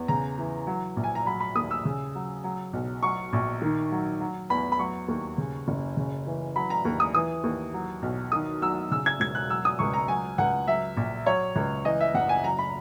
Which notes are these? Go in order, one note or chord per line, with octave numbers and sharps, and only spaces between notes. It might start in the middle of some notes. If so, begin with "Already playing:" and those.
Already playing: E2
C#3 A#5
E3
F#3
A#1
G#5
A#5
F#3 B5
B5
D#2 D#6
E6
C#3
F#3
F#3
B1
F#3 C#6
A#1
D#3
F#3
F#3
E2 B5
B5
F#3 C#6
D#2
C#3
F#1
C#3
E3
F#3 B5
A#5
D#2
D#6
E3 D#6
D#2
F#3
B1
D#3 D#6
F#3 E6
C#3 E6
G#6
E1 G#6
F#6
F#3 E6
D#6
C#2 C#6
A#5
F#3 G#5
C#2 F#5
F#3 E5
A#1
F#3 C#5
C#2
E3 D#5
E5
F#1 F#5
G#5
F#3 A#5
B5